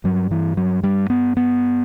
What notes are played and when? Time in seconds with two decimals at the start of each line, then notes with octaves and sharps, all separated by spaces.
0.04 G2 F#3
0.31 E3
0.57 F#3
0.83 G3
1.10 B3
1.37 B3